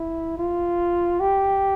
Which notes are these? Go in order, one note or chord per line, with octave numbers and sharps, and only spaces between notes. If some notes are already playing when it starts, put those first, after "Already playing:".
Already playing: E4
F4
G4